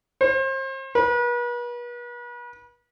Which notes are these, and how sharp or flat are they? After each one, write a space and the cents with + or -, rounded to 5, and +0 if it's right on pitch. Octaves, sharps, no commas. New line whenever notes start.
C5 +35
B4 -40